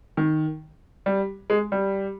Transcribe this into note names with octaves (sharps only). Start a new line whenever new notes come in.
D#3
G3
G#3
G3